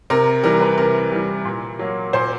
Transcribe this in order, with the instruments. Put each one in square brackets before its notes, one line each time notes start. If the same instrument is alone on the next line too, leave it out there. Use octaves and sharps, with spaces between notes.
[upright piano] C3 A#4
E3 G3 A#4
B4
C3 A#4
E3 G3
A#2
F#3 A#3
A#2 C5